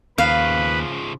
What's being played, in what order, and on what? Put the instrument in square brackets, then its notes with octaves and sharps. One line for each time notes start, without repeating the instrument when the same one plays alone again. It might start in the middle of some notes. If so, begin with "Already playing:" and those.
[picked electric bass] D#2 [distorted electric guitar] C#3 F3 [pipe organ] B4 [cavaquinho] F5